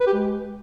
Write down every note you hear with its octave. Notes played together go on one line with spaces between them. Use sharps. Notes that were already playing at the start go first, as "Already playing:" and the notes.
B4
G4
G#3